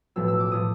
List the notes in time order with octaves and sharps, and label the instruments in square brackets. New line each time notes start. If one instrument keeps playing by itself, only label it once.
[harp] B1 A2 F3 E6
E6
D6
A2 F3 D#6